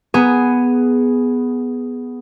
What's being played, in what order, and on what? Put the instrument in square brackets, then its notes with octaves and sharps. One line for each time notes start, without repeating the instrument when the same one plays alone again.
[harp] B3 G#4